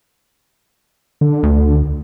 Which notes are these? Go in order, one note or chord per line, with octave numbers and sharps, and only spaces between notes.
D3
D2